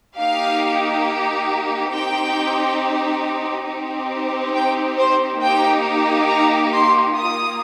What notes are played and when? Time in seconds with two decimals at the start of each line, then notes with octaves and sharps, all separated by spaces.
0.18 A#3 D#4 G4 F5
1.93 C4 D#4 G4 G5
3.67 C4 D#4 G4
4.55 G5
4.98 C5
5.42 A#3 D#4 G4 G5
6.29 A#5
6.73 C6
7.16 A#3 F4 D#6